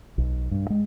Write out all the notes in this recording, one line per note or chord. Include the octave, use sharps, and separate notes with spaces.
B1
G2
G#3